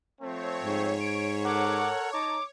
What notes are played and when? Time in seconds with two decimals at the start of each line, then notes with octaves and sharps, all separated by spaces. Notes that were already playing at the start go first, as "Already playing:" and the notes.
0.21 F3 A3 C4 C#5
0.62 G#2
1.00 D7
1.44 A4 A#4 F#5 D6
2.12 D#4 A5 A#5 D6